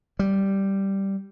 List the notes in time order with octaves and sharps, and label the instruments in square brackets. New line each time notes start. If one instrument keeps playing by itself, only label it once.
[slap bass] G3